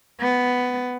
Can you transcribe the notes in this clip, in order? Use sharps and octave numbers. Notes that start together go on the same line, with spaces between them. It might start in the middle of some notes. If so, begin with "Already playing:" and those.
B3